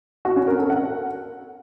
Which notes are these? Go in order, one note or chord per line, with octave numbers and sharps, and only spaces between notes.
F#4
C#4
A#4
A4
F#5